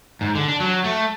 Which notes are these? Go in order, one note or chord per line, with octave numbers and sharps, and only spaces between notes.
G#2
D3
D4
F#3
A3